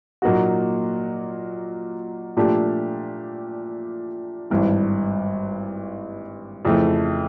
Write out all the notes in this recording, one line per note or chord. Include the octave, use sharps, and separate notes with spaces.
A#2 F#3 A#3 D#4 F#4
A#2 F3 A3 D4 G4
G#1 G2 E3
F2 C#3 E3 A3